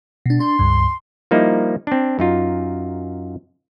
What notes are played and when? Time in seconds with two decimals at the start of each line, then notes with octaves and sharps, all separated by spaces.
0.26 B2 D4
0.40 D4 C6
0.59 C#2 G2
1.31 F3 G3 A#3 D#4 E4
1.87 C4 D4
2.19 F#2 D#4 F4